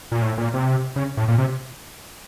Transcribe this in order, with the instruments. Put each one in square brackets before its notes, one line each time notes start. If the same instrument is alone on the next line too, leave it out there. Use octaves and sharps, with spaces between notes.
[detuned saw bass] A#2
A2
A#2
C3
C#3
A2
A#2
C3